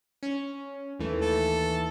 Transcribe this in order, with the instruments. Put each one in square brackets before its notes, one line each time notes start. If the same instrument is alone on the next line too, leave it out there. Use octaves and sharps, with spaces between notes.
[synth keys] C#4
D#2 E3 A3
[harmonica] A4